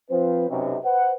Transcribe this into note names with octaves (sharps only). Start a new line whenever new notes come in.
F3 C4 B4 C5
B1 F#2 C3
B4 C5 F#5